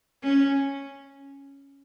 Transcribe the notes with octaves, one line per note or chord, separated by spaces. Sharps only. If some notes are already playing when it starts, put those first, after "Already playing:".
C#4